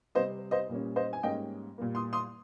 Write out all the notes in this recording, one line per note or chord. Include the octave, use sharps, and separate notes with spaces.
C3 G3 C4 C5 D#5
C5 D#5
A#2 G3 A#3 C#4
C5 D#5
G#5
G#2 G3 A#3 C#4 D#5 G5
A#2 G3 A#3
C6 D#6
C6 D#6